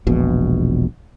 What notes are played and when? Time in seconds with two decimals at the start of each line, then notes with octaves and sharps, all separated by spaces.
0.07 E1 A#1 B2